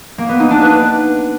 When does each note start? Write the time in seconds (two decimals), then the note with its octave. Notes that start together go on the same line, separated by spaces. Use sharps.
0.18 A#3
0.29 B3
0.40 D#4
0.51 D4
0.61 B4